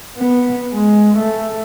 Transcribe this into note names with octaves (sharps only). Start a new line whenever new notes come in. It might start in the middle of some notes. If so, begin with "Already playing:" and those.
B3
G#3
A3